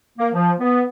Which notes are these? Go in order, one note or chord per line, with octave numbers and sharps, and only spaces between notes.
A#3
F3
B3